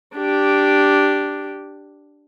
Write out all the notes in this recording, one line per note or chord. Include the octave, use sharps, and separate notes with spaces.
D4 G4